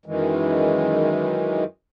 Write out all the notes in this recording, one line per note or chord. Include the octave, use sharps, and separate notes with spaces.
F#2 D#3 E3 G#3